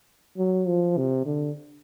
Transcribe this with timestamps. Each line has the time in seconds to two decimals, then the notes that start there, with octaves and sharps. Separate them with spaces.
0.38 F#3
0.67 F3
0.97 C3
1.25 D3